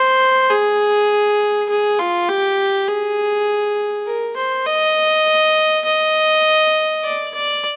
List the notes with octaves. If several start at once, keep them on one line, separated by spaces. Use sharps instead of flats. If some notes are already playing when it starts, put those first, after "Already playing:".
Already playing: C5
G#4
G#4
F4
G4
G#4
A#4
C5
D#5
D#5
D5
D5